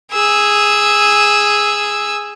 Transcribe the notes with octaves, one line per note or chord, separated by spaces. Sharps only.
G#4 E6